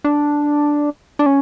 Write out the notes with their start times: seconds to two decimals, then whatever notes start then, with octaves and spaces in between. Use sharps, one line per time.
0.04 D4
1.19 D4
1.26 C#4